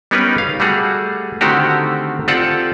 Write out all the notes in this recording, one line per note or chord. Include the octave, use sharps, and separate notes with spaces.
G3 B3 C#4 D#4 A#4 B4
F5
G3 A3 F#4 G#4
D3 D#3 A3 C4 F#4 G4
C4 F4 G4 A4 D5 F#5